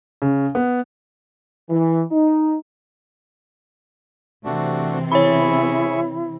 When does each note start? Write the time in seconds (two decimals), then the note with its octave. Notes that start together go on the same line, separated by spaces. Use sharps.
0.22 C#3
0.55 B3
1.70 E3
2.11 D#4
4.45 C3 E3 A3 C4 D4 F#4
5.12 E4 G#4 C#5 E5 B5 C#6